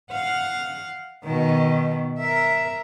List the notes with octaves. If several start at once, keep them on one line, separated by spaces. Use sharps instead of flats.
F5 F#5
B2 D#3
A#4 E5